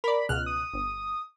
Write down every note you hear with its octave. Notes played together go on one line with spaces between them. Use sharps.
A#4 D5 B5
C#2 B2 F6 F#6
D#6
G1